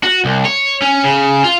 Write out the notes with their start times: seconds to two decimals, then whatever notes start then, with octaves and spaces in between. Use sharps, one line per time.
0.03 F#4
0.25 C2
0.45 C#5
0.82 C#4
1.04 C#3
1.44 F4